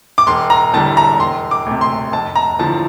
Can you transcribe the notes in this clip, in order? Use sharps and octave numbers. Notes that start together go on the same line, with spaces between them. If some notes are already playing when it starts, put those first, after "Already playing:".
D6
E1 C6
A#5
E2 D3 G3 A5
A#5
E1 C6
D6
D2 C3
C6
F1 A5
A#5
E2 D3 F3 A5